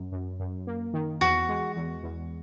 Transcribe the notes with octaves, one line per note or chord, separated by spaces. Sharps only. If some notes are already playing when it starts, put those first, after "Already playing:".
Already playing: F#2
F#2
F#2
A#3
D#3
E2 F#4
G#3
E2
E2